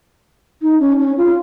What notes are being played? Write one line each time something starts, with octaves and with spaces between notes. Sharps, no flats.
D#4
C#4
C#4
F4